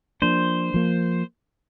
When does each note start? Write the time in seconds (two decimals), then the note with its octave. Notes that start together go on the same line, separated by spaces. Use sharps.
0.22 F3 A#3 D4 C5
0.74 F3 A#3